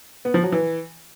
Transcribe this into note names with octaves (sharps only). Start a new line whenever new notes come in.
B3
F3
F#3
E3